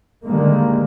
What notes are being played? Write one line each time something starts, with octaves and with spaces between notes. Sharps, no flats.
D3 D#3 G3 G#3 A#3